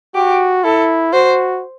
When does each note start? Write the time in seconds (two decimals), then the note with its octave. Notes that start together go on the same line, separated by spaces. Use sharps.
0.15 F#4 G4
0.64 E4 A4
1.13 F#4 C5